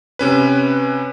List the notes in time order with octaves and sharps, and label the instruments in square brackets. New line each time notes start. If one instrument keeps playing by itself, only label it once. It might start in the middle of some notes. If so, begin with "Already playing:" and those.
[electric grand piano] C3 C#4 B4